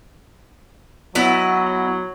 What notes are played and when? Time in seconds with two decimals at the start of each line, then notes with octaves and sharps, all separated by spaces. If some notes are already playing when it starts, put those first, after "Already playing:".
1.15 F#3 B3 E4 D#5